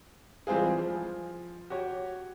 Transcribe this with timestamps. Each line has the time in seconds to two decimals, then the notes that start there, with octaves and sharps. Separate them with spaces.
0.47 E3 G3 G#3 C4 F4 G#4
0.79 F3
1.70 F#4 G4 C#5